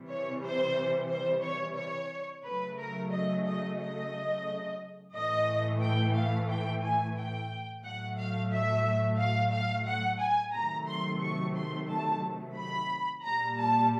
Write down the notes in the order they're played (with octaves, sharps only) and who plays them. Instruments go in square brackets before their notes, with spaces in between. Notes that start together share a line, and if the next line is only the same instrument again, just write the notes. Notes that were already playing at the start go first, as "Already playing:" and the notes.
Already playing: [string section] C3 E3 G3
C#5
C5
C5
C#5
C#5
C#3 F#3 A3 B4
A#4
D#5
D#5
D#5
A2 E3 A3 D#5
G5
F5
G5
G#5
G5
A2 F#3 A3 F#5
F5
E5
F5
F5
F#5
G#5
C3 D#3 F#3 A3 A#5
C6
C#6
C6
A5
B5
A#2 G3 A#5
A5